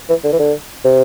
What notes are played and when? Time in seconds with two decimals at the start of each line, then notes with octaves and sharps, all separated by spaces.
0.09 E3
0.24 D3
0.32 E3
0.39 D3
0.85 C3